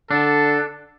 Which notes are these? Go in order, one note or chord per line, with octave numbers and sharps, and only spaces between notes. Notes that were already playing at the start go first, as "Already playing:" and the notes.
D3 D4 A4